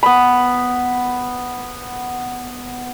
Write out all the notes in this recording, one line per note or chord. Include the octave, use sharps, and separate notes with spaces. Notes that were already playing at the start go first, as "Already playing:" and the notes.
B3 B5